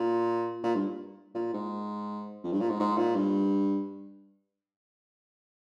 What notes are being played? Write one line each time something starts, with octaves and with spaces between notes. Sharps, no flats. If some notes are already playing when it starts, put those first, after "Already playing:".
Already playing: A#2
A#2
G2
A#2
G#2
F2
G2
A#2
G#2
G#2
A#2
G2